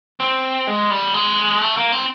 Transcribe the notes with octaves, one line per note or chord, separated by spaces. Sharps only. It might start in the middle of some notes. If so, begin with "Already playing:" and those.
C4
G#3
G3
G#3
A3
A#3
C4